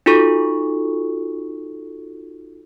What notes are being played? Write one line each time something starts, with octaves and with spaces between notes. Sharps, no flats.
D#4 F4 F#4 A4 C#6